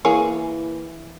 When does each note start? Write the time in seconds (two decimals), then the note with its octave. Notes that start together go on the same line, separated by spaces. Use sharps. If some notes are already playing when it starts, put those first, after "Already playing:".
0.05 E3 A#3 G#4 C#5